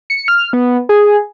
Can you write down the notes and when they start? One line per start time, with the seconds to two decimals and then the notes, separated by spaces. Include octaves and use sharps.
0.10 C#7
0.28 F6
0.53 B3
0.89 G#4